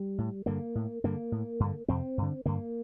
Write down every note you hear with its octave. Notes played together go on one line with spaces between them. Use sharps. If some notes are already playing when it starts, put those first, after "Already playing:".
Already playing: G3
A2
G2 D3 A#3
A2
G2 D3 A#3
A2
G2 D3
F2 C3 C4
G2 D3
G2 D3 A#3